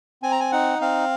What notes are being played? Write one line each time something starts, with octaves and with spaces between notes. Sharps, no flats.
C4 G#5
A#5
G#5
D#4 F#5
C4 F5